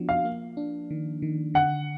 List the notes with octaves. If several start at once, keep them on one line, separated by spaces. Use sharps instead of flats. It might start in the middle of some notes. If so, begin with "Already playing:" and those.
Already playing: F3 B3 D4 F#4
F5
A#3
D4
D#3
D#3
D3 F#5